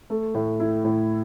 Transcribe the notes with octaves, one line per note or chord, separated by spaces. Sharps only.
A3
A2
E4
A2